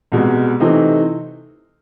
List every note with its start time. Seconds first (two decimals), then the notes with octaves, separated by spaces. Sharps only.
0.12 C2 B2 G#3
0.60 C3 E3 A3 C4 D#4